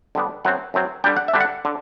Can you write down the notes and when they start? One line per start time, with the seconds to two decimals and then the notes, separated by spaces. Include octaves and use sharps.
0.15 D3 G3 B3 D4
0.45 F#2 F#3 C4 F#5
0.74 F#2 F#3 C4
1.04 D3 G3 D4 G5
1.17 F#5
1.28 E5
1.34 D3 G3 D4
1.40 F#5
1.65 D3